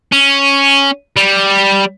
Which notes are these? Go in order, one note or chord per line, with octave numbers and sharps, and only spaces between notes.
C#4
G3